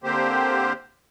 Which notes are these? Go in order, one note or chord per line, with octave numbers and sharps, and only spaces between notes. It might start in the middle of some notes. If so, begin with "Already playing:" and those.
D3 A#3 C4 G4 C5